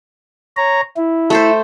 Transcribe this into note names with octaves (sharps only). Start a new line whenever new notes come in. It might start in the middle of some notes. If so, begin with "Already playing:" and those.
C#5 A#5
E4
A3 A4 C5